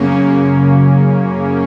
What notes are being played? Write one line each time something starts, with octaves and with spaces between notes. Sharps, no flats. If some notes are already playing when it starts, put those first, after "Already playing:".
Already playing: F#2 C#3 A#3 C#4